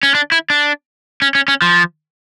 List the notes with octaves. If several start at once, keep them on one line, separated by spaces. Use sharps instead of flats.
C#4
D4
E4
D4
C#4
C#4
C#4
F3